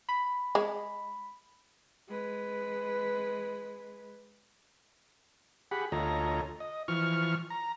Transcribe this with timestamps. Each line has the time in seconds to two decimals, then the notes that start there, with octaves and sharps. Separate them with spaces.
0.09 B5
0.55 G#3
2.09 G#3 B4
5.71 G4 G#4 F#5 B5
5.92 D2 F4 A4 C#5 D#5 A#5
6.60 D#5
6.88 E3 F3 C#6 F6
7.50 A#5